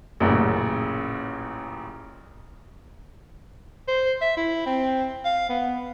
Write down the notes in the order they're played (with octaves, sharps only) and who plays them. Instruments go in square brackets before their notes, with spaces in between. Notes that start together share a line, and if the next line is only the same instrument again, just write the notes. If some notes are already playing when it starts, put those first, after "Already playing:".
[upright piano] A1 F#2 A#2 C#3
[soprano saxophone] C5
E5
E4
C4
F5
B3